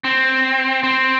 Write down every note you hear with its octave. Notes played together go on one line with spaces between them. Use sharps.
C4
C4